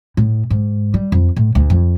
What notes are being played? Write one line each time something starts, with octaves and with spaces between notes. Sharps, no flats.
A2
G#2
G3
F2
A2
D2
F2